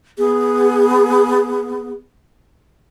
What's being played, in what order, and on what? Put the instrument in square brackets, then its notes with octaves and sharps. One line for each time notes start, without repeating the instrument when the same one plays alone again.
[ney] B3 [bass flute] G#4